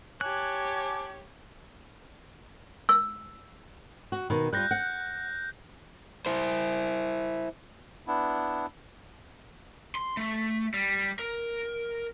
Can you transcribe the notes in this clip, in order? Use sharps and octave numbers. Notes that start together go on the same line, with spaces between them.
G4 C#5 G#5 A5 D6 F#6
E6
F#4
B2 D#3
G3 F4 F#6 G6 A#6
F#5
E4 C5
B3 D4 E4
C6
A3
G3
A#4